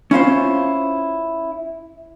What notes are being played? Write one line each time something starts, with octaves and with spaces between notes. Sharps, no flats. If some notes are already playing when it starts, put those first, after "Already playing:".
C#4 E4 F4 C5